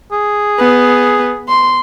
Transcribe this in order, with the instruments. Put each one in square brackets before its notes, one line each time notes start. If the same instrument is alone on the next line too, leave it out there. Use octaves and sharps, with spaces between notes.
[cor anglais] G#4
[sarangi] B3
C6